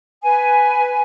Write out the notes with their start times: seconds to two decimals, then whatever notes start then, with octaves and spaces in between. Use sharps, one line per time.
0.23 B4 G#5